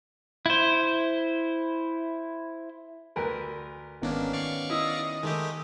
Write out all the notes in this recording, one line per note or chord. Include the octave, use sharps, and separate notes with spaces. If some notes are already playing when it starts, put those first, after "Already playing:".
E4 C5
D2 A#4 B4
G#1 D#3 A#3 B3 C#4 D4
D5 F5 C#6
E4 D#5
D#3 G#3 A3 G4